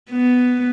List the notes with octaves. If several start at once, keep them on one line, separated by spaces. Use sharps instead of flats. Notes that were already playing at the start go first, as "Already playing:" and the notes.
B3